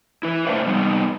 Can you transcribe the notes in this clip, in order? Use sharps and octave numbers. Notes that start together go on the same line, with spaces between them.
E4 B4
A2 D4 C5 E5 F5 G5
G3 B3 D#4